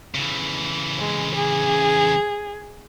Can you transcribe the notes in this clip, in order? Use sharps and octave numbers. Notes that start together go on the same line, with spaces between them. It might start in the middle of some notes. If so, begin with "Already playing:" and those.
C#3 E3
G#3
G#4